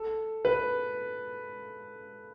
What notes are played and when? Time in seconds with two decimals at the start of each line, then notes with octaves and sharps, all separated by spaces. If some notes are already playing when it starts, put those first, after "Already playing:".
Already playing: A4
0.45 B4